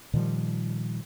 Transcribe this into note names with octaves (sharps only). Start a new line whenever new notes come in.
A#2 D#3 F3 G3